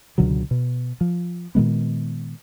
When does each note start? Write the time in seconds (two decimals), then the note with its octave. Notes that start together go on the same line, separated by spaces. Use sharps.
0.18 C#2 B2 D3 F#3
0.51 B2
1.01 F3
1.55 A#2 D#3 G#3 B3